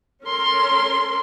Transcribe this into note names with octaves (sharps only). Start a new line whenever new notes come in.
C#4 A4 A#4 C6